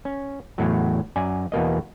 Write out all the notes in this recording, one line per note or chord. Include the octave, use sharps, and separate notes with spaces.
C#4
E2 A2 F#3
F#2 D5 G#5
E2 B2 A#3 D#5